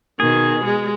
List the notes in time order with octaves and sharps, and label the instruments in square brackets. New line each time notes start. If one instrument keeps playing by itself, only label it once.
[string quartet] B2 D#3 [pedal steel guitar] G#4
[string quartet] G#3